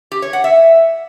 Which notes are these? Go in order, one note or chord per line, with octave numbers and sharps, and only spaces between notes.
G4
C#5
F#5
E5